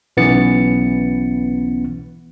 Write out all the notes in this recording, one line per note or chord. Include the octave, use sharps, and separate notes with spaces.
B1 E3 B3 C#4 A6 C#7